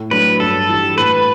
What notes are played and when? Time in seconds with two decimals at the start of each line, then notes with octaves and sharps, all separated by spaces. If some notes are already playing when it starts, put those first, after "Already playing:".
Already playing: A2
0.11 F#3 A3 D4 B4
0.40 G2 A4
0.69 E3 G3
0.98 A2 B4